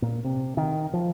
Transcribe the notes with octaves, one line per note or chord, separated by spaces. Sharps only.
A#2
C3
D#3
F3